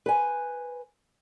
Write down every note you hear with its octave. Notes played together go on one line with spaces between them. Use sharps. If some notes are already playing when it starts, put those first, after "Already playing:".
B4 C5 G#5